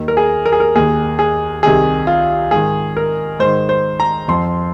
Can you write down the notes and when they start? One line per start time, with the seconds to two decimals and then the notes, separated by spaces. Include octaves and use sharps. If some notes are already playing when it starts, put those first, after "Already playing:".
Already playing: D#2 D#3
0.08 A#4
0.17 G#4
0.46 A#4
0.52 G#4
0.60 A#4
0.75 D#2 D#3 G#4
1.19 G#4
1.63 C2 C3 D#3 G#4
2.07 F4
2.51 G#2 D#3 G#4
2.97 A#4
3.40 G#2 D#3 C5
3.69 C5
4.00 A#5
4.28 F2 F3 C6